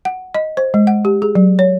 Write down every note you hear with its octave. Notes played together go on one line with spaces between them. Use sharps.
F#5
D#5
C5
G#3
F#5
G4
G#4
F#3
C#5